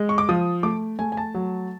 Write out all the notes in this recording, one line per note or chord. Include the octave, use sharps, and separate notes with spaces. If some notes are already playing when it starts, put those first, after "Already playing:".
Already playing: G#3
C#6
D6
F3 D#6
A3 D6
A3 G#5
G#5
A5
F#3